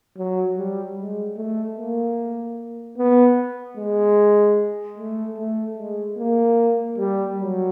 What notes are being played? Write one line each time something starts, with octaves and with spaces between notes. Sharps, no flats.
F#3
G3
G#3
A3
A#3
B3
G#3
A3
A3
G#3
A#3
G3
F#3